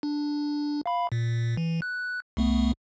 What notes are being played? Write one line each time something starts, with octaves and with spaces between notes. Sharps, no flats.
D4
F5 B5
A#2
E3
F#6
C2 A3 B3